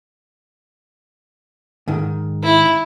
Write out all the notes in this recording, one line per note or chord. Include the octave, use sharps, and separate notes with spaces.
G#2 D#3
E4